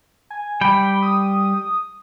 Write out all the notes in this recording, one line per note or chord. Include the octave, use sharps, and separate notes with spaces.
G#5
G3 G5 B5
D#6